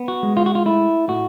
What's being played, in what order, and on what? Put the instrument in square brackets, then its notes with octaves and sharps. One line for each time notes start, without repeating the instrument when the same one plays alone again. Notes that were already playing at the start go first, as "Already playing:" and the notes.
Already playing: [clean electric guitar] B3
F#4
G#3
F4
F#4
F4
A3 E4
A2 F#4